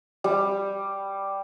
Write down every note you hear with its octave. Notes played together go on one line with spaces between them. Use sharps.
G3